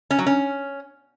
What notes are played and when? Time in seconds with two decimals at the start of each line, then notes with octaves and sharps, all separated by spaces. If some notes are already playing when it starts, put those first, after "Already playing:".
0.11 C#4
0.19 F#3
0.27 C#4